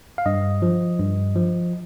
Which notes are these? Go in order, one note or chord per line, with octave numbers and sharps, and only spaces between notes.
F5
G2 D#5
F3
G2
F3